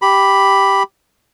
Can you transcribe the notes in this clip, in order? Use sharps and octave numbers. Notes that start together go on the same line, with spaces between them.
G4 B5